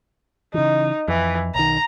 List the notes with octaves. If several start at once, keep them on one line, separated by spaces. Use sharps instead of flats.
C#3 E3 D#4
F2 E3
B1 D#3 A#5